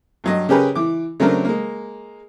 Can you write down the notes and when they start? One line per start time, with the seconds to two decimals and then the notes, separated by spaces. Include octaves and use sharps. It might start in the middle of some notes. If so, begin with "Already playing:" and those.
0.24 G2 F#3 D#5
0.49 C#3 C#4 G4 G#4 A#4 B4
0.75 E3 D6
1.20 C#3 F#3 A3 C4 D4 A#4
1.45 G#3 A#3